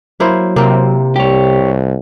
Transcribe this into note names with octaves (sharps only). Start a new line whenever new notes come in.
F#3 A#3 E4 C5
C3 A#3 C4
C2 G4 C#5